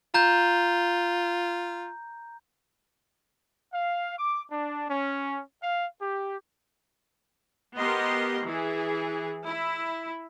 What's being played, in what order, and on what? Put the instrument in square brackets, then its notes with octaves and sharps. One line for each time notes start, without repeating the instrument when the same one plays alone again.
[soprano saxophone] F4 [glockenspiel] A#5 G6
[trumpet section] F5
D6
D4
C#4
F5
G4
[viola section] B3 G4 A#4 D#5 C6
E3 G#4
E4